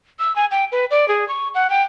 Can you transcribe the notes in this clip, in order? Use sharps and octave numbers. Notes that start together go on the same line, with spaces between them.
E6
G#5
G5
B4
D5
G#4
C#6
F#5
G5